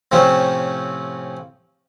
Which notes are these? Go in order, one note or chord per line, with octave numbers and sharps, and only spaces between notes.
A2 C3 F3 C4 C#4